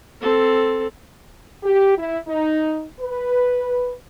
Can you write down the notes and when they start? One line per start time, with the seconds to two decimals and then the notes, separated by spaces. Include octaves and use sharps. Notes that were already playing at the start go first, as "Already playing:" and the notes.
0.21 C4 A4
1.63 G4
1.97 E4
2.27 D#4
3.00 B4